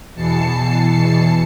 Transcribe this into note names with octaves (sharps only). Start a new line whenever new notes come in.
E2 B2 E3 A5 C7 C#7